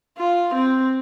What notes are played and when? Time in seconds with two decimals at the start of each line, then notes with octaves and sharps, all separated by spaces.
0.18 F4
0.55 C4